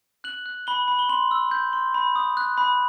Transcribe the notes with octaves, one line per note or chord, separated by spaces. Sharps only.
F#6 F#7
F#6
B5 G7
B5
G7
C6 F#7
E6
G6
C6
B5
D#6
F#6
B5